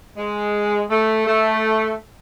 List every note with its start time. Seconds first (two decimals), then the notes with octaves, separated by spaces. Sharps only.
0.17 G#3
0.90 A3
1.27 A3